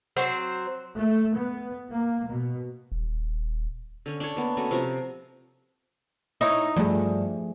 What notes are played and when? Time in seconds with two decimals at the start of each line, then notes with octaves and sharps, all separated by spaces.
0.17 F#3 C4 C5
0.98 A3
1.36 B3
1.91 A#3
2.29 B2
2.92 D#1
4.06 D3 C#4
4.20 D4 C#5
4.36 A#3 B3
4.57 A3 C#4 F#4
4.71 C3 F3 A#5
6.41 D#4 E4 C#5
6.76 G2 F3 A3 G#4